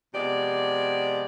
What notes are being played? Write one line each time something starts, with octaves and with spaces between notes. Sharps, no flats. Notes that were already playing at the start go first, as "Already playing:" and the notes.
C3 F3 G#3 B3 G4 D5